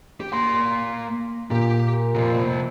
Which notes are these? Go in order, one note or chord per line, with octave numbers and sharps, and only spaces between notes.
G4
A#3 C6
A#2 G4
C3 F3